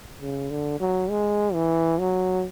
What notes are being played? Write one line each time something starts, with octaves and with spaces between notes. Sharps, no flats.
C#3
D3
F#3
G#3
E3
F#3